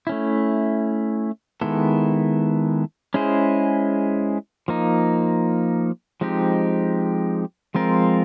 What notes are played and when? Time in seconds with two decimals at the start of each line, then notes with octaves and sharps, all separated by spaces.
0.07 A3 C#4 E4
1.61 D#3 G#3 B3 E4 A4
3.14 G#3 C#4 E4 G#4 C5
4.68 F3 A#3 D#4
6.21 F3 G#3 C4 D#4 G4
7.74 F3 G#3 C4 F4 A#4